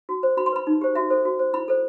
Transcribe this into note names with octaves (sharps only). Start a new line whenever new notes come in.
F#4
C5
F#4 B5
C6
B4 B5
D#4
G4 C5
F#4 E5
A4 C5
F#4
C5
E4 B5
A4 C5